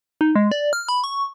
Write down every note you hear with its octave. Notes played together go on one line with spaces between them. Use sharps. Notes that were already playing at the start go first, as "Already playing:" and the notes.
D#4
G#3
D5
F6
B5
C#6